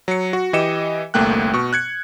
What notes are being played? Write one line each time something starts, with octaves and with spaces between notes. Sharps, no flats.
F#3 C#7
F#4
E3 G4 D#5 C#7 E7
G1 C2 A3 A#3 G5 F#6
B2 C#6
F#6 G#6 C#7